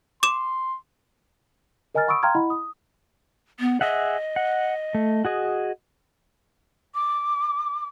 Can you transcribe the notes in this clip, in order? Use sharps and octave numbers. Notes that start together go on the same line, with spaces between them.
C6 D6 E7
A#4 D#5 G#5 A#5 F6 A6
F#5 B5 C#6 D#6 E6 D7
F5 G5 A#5 C6 F6 G#6
E4 D#5 F#5 B5
D#6
B3
G#4 D#5 E5 F#5
F#5
A3
F#4 G#4 D#5
D6